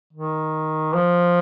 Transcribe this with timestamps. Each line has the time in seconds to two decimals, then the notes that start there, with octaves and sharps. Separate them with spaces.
0.13 D#3
0.94 F3